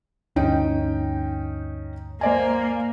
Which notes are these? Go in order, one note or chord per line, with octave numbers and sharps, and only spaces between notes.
D2 G2 C#4 D#4 G5
A#3 C5 D5 G#5